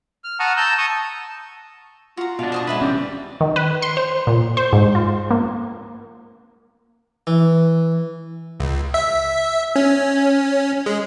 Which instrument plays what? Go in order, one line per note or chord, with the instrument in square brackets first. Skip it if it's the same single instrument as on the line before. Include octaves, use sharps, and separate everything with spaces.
[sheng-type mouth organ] F6
F#5 A5 A#5 C#6 D#6 F6
A5 A#5 E6 G6
A5 C#6 D#6
[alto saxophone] F4 [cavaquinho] F#4 A#5
[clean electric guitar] B2 D4 [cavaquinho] F5
[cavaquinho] C5 D#5 C#6
[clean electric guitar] G#3 B4 [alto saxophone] D4 [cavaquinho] D5 E5 F#5
[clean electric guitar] C3 E3 G3 [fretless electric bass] C#4
[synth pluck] D#3
B4
C6
C5
A#2
C5
G#2
F4
A#3
[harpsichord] E3
[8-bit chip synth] C#2
E5
C#4
G#3